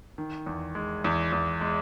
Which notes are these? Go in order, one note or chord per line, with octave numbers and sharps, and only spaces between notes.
D#3
E2
G#3
E2
E2
G#3